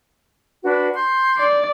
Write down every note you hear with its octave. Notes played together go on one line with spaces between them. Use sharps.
D4 F#4 B4
C6 G6
D5